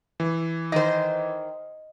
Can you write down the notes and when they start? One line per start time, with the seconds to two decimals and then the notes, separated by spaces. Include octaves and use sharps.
0.20 E3
0.72 D#3 C5 D#5